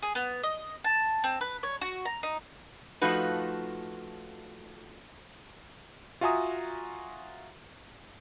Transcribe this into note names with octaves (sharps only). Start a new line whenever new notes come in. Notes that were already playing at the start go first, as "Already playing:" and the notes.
G#4
B3
D#5
A5
C4
B4
C#5
F#4
A#5
D#4
F3 A3 D#4 F4 F#4 B4
F4 F#4 E5 G#5 A#5 D#6